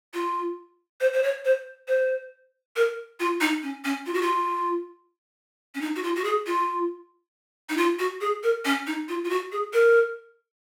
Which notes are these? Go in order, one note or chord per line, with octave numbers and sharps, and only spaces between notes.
F4
C5
C5
C#5
C5
C5
A#4
F4
D#4
C#4
C#4
F4
F#4
F4
C#4
D#4
F#4
F4
F#4
G#4
F4
D#4
F4
F#4
G#4
A#4
C#4
D#4
F4
F4
F#4
G#4
A#4